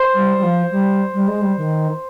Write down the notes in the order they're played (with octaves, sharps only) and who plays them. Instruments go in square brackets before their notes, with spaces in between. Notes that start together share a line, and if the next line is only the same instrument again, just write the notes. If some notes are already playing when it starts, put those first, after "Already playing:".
Already playing: [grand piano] C5
[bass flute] G3
G3
F3
G3
G3
G#3
G3
D#3